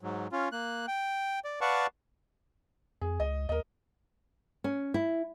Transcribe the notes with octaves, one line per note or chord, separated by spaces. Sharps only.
G#2 F#3
C#4 F4
A#3 F#6
G5
D5
B4 D5 F5 F#5 A5 C#6
F2 G#4
C#2 D#5
D#2 A#4 D#5
C#4
E4